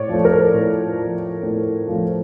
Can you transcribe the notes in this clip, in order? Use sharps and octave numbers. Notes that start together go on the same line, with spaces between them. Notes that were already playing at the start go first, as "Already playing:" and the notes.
Already playing: A2 C#5 D5
F3 A3
A#4
A2
F3 A3
A2
F3 A3